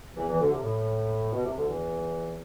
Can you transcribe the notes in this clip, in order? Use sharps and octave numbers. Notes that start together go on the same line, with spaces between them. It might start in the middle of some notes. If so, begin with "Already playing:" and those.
E2 E3
E2 E3
D2 D3
C2 C3
A2
B2
C2 C3
D2 D3
E2 E3